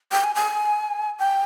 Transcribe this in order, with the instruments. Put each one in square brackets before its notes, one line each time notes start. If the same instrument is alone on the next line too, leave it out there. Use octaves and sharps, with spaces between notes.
[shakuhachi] G5
G#5
G#5
G5